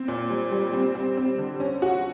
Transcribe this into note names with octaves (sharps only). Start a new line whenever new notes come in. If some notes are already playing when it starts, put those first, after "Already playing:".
Already playing: C4
A#2
G3
G3
C4
C4
C4
D3
C#4
F#4